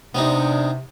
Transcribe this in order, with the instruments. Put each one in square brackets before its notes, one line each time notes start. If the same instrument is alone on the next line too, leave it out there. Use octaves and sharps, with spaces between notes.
[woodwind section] C3 [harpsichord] B3 C4 D#4 [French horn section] D4